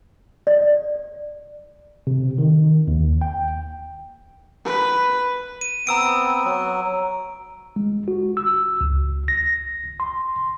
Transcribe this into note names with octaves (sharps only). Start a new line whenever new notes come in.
D5
C3
D#3
D#2
G5
B4
D#7
B3 C4 A#5 E6 D7
F#3
G#3
F#4
E6
C#2
A#6
C6